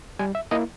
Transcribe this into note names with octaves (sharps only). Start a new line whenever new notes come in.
G3 G#5
E5
A#3 E4 D#5